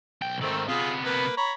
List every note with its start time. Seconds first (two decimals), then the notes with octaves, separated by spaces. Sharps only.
0.22 B1 G5
0.42 G#2 D#3 A3 C4
0.68 C3 B3 F4 G#4
1.04 A#3 B4
1.37 C#5 A#5 B5